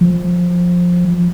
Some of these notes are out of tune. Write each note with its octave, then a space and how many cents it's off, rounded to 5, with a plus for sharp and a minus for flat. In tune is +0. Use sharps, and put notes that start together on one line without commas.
F3 +15